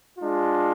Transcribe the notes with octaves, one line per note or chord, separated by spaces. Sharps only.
G#3 D4 F4